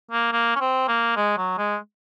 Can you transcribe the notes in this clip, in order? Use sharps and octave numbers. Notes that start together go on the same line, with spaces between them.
A#3
A#3
C#4
C4
A#3
G#3
F#3
G#3